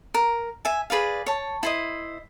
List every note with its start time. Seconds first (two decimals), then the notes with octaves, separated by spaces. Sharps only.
0.14 A#4
0.65 E5 G#5
0.90 G#4 B4 D5 F5
1.26 C#5 A5
1.63 E4 C5 D#5